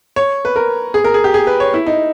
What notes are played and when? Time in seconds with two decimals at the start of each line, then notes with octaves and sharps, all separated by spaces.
0.16 C#5
0.45 B4
0.56 A#4
0.94 G#4
1.04 A#4
1.14 G#4
1.24 G4
1.34 G#4
1.47 B4
1.60 C#5
1.74 E4
1.86 D#4